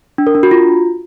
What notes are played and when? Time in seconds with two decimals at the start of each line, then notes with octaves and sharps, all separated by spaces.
0.18 D4
0.27 A#4
0.35 D4
0.43 F#4
0.51 F4